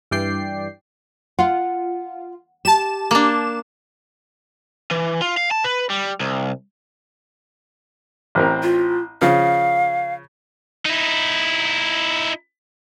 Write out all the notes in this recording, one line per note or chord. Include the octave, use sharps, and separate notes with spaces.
G2 E3 D5 G5 C7
F4 F#5
G4 A5 E7
A#3 D4
E3
F4
F5
A5
B4
G3
C2
A1 C4 A#4
F4
C#3 F3 F5
D#4 E4